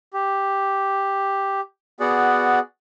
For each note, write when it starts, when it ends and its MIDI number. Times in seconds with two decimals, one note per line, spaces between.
0.13 1.60 67
2.00 2.59 59
2.00 2.59 66
2.00 2.59 68
2.00 2.59 74
2.00 2.59 78